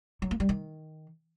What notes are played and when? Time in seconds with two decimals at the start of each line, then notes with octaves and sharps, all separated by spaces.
0.22 F#3
0.31 A#3
0.40 G3
0.49 D#3